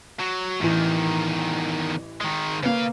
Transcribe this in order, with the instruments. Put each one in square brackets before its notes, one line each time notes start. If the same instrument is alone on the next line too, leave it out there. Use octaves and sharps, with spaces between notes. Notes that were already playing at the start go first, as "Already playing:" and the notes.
[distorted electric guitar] F#3
[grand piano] A1 E3 [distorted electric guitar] E2 D#3
[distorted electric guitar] D#3 G#3
[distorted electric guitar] C#3 F5 [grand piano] A#3 B4